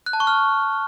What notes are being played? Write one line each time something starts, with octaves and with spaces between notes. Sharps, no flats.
F#6
A5
C#6
F6